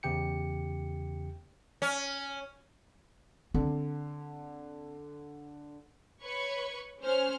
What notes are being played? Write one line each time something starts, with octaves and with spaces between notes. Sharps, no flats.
E2 C#3 G4 G5 C#7
C#4
D3 C4
B4 C#5 B5 C#6
C#4 C5 F6